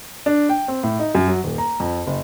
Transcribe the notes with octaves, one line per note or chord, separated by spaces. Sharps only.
D4
G5
C4
A2
D#4
F#2
F#3
D#1
A#5
F2
F#1